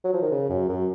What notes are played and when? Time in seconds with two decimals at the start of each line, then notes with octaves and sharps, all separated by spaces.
0.04 F#3
0.14 F3
0.22 D#3
0.32 C#3
0.50 F#2
0.69 F#2